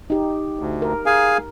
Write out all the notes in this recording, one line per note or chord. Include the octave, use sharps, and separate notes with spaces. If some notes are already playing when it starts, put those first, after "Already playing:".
D#4 G4
D2
A#4
G#4 F5 G#5